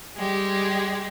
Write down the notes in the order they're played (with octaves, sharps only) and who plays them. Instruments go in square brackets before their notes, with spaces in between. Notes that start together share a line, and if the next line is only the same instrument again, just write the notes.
[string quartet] G3 G#3 G4